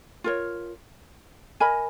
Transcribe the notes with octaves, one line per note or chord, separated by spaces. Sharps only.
F4 A#4 C#5
A#4 D#5 G#5 B5